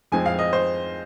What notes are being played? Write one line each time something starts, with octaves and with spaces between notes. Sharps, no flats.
F2 F3 G#3 C4 G#5
F5
D#5
C5